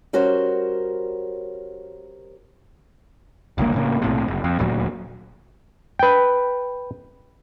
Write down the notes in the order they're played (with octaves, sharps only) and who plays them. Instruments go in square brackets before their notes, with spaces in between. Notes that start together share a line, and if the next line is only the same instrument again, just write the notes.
[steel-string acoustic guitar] G3 C#4 F#4 A#4 C5
[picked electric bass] G1 C#2 G2 A#3
A2 C#3 A#3
B1 A2 C3
F#1
F2
D#1 D2 A#2 F#3
[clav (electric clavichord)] B4 G5